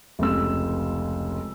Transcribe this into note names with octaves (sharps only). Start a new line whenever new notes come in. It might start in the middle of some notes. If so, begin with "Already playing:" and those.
F1 C#2 E6